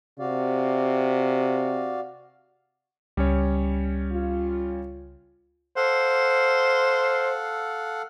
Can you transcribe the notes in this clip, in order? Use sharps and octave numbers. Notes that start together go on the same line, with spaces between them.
C3 F#4 D5 F5
C#2 G3 C#4 C#5
F4
A4 C5 F5 F#5